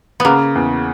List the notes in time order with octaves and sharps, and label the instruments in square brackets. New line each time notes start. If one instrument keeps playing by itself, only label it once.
[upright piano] C#3 [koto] A#3 B3
[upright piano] E2